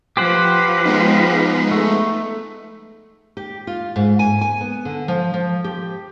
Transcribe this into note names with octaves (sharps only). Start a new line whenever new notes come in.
F3 G4 B4 C5 F#5
G#3 B3 D#4
A3
G4
F4
G#2
G#5
G#5
B3
D3
F3
F3
G4